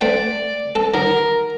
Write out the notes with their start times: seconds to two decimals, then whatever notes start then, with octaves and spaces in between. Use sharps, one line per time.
0.01 A3 C5 D5 G5
0.75 A4 A5
0.94 D#3 F#3 A#4